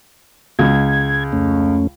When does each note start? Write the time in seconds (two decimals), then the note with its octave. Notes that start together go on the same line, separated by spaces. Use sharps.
0.59 C#2 G#6
1.33 F2 A3 C#4